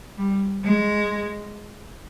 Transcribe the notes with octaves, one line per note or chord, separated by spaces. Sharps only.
G3
G#3